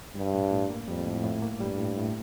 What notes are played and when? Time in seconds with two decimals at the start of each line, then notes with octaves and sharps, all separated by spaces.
0.15 G2 G3
0.34 A2
0.51 A2
0.70 A#3
0.87 F2 G3
1.06 A2
1.23 A2
1.42 A#3
1.60 G2 G3
1.78 A2
1.96 A2